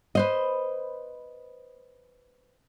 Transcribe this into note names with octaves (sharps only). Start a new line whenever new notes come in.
B4 C5 D#5